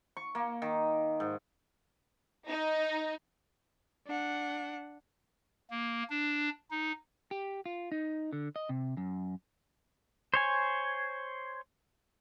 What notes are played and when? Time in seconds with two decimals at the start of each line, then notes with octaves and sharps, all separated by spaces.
0.17 C#6
0.35 A#3
0.62 D#3
1.20 G#2
2.50 D#4
4.07 D4 F#5
5.71 A#3
6.10 D4
6.71 D#4
7.31 G4
7.66 F4
7.92 D#4
8.33 D3
8.56 D#5
8.69 C3
8.97 F#2
10.34 C5 C#5 G#5